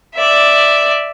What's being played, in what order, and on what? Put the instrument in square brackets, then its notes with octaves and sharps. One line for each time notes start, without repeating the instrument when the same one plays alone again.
[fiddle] D5 E5